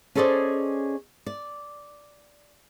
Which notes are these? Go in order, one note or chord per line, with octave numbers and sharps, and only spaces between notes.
C#4 G#4 A4 C5 D5 D#5
D5